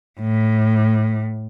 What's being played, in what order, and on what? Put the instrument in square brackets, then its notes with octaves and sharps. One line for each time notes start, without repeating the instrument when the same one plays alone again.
[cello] A2